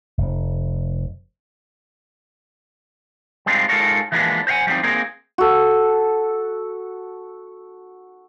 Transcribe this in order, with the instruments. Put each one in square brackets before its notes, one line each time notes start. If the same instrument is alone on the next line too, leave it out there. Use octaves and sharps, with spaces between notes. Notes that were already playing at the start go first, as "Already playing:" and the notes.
[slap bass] F1
[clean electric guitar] G3 G#3 C4 D4 D#4 F4
G#3 D#4 F4 A4 A#4 C#5
E3 F3 G#3 A#3 B3 D4
C5 D#5 F5 F#5 G#5
F3 G3 A3 C4 D#4
A#3 C4 D#4 G#4 A#4
[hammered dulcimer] F#4 A4